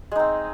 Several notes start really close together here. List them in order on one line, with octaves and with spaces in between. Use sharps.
G#3 D#4 C4